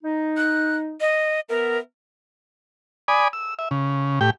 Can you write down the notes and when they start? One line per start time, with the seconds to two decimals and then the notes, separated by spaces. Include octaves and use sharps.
0.04 D#4
0.37 F#6
1.01 D#5
1.49 B3 A#4 E5
3.08 D5 G#5 B5 D#6
3.33 E6
3.59 E5
3.71 C#3
4.21 A2 G4 G5